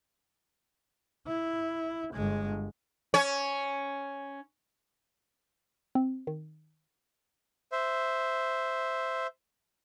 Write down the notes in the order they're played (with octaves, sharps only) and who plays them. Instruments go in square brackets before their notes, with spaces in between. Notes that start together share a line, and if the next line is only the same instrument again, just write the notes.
[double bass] E4
G1 G#3
[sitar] C#4 C#5
[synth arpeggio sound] C4
D#3
[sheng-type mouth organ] C5 E5